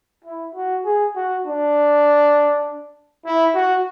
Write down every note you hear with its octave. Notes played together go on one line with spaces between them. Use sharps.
E4
F#4
G#4
F#4
D4
E4
F#4